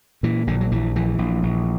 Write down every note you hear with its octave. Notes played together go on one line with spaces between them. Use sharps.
A#2 E3
A#1 D3
F#3
A#1 E3
A#1 E3
A#1
A#1